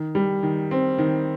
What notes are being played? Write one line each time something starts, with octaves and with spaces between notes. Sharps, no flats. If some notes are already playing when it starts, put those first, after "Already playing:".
Already playing: D#3
G3
D#3
C4
D#3